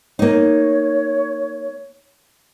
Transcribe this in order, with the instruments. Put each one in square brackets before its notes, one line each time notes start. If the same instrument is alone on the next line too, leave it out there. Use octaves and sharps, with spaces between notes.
[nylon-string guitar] A#3 D#4 [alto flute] C#5